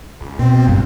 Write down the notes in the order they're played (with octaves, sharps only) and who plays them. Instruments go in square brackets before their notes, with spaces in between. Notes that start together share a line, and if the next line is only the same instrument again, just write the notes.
[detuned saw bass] C#2
[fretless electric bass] B2 [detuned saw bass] C4
[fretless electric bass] F#1 G2 [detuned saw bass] A#2